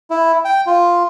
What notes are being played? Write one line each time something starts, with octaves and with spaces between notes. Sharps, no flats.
E4
G5
F4